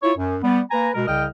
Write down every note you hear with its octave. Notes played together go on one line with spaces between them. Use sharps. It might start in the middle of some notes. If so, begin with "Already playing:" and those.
E4 F4 C#5
F#2
G3 B3
A#3 B4 G#5 A#5
B2 G#3 A#4
C2 C#3 D#5 G5 F6